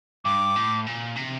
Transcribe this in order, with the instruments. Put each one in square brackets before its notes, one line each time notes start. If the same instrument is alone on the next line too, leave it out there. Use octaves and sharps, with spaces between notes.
[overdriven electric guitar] G2 [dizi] D6
[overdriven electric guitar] A2
A#2
C3